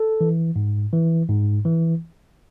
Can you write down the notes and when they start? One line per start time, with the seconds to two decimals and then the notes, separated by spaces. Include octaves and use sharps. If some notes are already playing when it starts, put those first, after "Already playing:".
Already playing: A4
0.21 E3
0.56 G#2
0.93 E3
1.29 G#2
1.65 E3